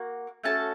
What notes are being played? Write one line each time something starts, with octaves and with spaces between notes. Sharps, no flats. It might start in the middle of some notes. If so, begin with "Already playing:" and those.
Already playing: A#3 F#4
A3 C#4 F#4 A4 A5